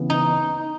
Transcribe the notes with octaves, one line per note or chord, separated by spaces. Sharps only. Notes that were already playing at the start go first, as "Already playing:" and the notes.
Already playing: C#3 E3 B3
D#4